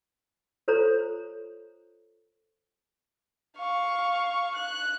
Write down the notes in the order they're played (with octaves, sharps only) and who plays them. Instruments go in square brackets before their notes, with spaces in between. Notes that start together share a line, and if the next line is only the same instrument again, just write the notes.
[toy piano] F4 A4 C5 C#5 A#5
[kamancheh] F5 C#6
F#6